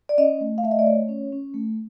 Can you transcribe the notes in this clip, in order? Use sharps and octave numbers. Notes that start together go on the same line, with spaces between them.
D5
C#4 D#5
A3
F5
A3 E5
D#5
D5
A3 C#5
C#4
C#4
A3